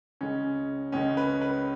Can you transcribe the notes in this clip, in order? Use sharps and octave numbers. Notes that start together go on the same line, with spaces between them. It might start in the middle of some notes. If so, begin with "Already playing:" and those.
C#2 C#3 G#3 C#4
C#2 C#3 G#3 C#4
B4
B4